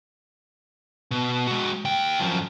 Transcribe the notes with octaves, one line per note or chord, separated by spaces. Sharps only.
B2
G#3 F#4
D#2 G5
F#2 F3